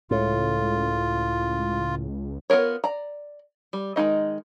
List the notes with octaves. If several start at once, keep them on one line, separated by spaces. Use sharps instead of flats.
C#2 A2 F4
B3 F4 A#4 C#5
D5 A#5
G3
D#3 G#3 D#4 D#5